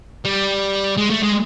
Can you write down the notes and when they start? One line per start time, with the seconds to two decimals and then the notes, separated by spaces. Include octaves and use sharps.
0.25 G3
0.97 G#3
1.10 A3
1.23 G#3